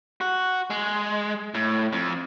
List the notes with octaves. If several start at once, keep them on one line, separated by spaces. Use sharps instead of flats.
F#4
G#3
A2
F2